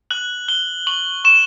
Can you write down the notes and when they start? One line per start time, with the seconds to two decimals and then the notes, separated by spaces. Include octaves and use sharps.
0.10 F#6 F#7
0.48 F#6 G7
0.87 C#6 F#7
1.25 C#6 E7